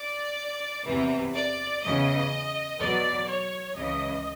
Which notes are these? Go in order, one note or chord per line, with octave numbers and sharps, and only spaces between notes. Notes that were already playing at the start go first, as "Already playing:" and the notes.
Already playing: D5
E2 C3 E3
D5
E2 C#3 E3 D#5
E2 B2 F#3 D5
C#5
C#2 C#3 E3 D#5